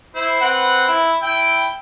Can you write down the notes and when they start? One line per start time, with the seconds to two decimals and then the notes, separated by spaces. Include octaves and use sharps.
0.15 E4 C5
0.41 C4 B4 F#5
0.88 E4
1.22 E4 G5